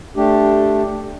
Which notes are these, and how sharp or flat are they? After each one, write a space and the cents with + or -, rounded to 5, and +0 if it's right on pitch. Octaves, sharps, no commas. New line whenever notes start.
A3 -5 D4 +0 G4 +0